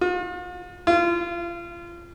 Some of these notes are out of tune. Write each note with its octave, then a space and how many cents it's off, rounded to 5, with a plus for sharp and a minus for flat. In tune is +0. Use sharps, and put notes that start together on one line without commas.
F4 +45
F4 -25